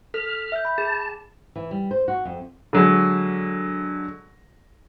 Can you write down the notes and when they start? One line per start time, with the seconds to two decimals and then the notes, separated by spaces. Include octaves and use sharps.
0.14 A4 F6 B6
0.52 E5 G6
0.65 B5
0.78 G#4 A5
1.56 E3
1.71 G3
1.91 C5
2.08 F#4
2.25 F2
2.73 D3 F#3 G#3